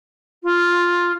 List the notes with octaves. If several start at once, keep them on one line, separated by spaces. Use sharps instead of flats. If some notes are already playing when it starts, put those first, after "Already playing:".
F4